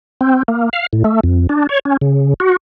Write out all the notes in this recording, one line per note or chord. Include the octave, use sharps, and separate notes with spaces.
C4
A#3
F5
A2
A3
F2
D4
C#5
C#4
C#3
F#4